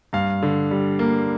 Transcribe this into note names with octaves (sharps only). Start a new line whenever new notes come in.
G2 F5
D3
G3
A#3